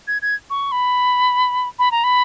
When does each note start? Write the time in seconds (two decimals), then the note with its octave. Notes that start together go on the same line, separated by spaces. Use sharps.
0.08 G#6
0.22 G#6
0.50 C#6
0.72 B5
1.79 B5
1.91 A#5
2.04 B5